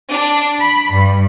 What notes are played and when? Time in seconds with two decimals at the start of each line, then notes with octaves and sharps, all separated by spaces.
0.12 D4
0.60 B5
0.93 G2